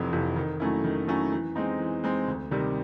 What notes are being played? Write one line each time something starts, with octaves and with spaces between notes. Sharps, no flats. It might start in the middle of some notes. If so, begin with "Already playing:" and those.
Already playing: F1 F2 C3 E3
F2 C3 E3
D#3
F#3 A3 C#4 E4
D#3
F#3 A3 C#4 E4
E3
G#3 C4 D#4
E3
G#3 C4 D#4
D2
C3 D#3 G3